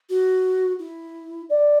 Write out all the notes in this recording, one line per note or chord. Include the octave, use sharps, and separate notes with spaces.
F#4
E4
D5